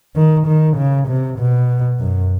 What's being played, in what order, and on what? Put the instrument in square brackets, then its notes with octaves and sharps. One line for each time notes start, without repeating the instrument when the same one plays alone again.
[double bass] D#3
D#3
C#3
C3
B2
F#2